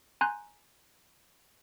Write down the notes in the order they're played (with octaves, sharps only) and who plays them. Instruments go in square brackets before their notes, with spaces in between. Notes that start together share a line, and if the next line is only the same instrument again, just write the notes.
[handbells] G#5 A#5 C6 F#6 G6